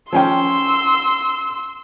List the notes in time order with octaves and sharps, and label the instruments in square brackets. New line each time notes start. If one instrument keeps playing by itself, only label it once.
[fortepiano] F3 C#4 G5 [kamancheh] C6 E6